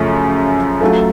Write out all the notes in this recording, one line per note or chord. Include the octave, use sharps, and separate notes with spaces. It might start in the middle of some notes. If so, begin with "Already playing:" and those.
Already playing: F#2 C#3 F3 A3
F#3 A3 C#4 F4 A4